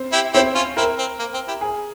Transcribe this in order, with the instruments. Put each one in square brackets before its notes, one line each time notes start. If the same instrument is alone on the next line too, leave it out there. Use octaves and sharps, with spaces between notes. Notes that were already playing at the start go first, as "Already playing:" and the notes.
Already playing: [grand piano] C4
[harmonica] E4 G4
[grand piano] C4 [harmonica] E4 G4
[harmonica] C#4 F4
[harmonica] C4 E4 [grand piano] A#4
[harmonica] C4
A#3
C4
E4 G4
[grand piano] G#4